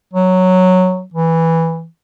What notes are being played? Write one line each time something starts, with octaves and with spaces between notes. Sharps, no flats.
F#3
E3